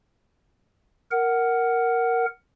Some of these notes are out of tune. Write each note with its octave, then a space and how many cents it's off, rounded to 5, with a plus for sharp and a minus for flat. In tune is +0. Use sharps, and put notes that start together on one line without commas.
A#4 +0 F#5 +10